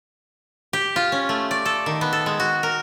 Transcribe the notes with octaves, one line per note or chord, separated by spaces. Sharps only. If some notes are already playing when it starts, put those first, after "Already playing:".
G4
F4
C#4
A3
D5
A4
D#3
B3
A4
G#3
F#4
A#4